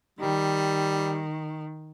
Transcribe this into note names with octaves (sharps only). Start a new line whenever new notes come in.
D#3 G3